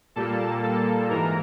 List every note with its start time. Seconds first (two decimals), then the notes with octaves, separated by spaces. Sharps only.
0.16 A#2 G3 A#3 A4 A5
0.63 A4 A5
1.10 G#2 E3 A#4 A#5